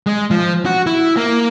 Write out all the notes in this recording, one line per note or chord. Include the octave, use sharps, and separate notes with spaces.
G#3
F3
F#4
E4
A#3